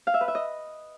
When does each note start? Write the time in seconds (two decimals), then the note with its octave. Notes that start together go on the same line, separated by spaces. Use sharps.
0.07 F5
0.14 E5
0.21 B4
0.28 E5
0.35 D#5